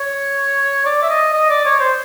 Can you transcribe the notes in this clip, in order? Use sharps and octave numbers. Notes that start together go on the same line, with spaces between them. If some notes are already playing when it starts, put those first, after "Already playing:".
Already playing: C#5
D5
E5
D#5
D#5
D5
C#5
C5